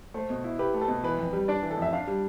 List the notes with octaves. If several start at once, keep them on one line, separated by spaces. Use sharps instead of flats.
A3 C5
B2
E4
G4 B4
A3
A4
B2
E3 B4
F2
G3
D4 D5
E3
A4
F2 E5
D4 F5
G3